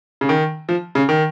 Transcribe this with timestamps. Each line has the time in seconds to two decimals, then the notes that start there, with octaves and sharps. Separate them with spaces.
0.21 C#3
0.29 D#3
0.69 F3
0.95 C#3
1.09 D#3